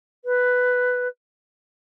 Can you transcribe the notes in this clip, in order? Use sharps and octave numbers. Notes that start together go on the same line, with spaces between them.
B4